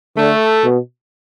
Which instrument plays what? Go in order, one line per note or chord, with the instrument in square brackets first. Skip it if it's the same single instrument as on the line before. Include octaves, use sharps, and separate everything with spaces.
[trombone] D3 [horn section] A3
[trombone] B2